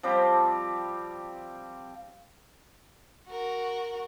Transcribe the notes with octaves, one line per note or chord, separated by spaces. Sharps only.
F3 G3 C4 G4
F#4 A#4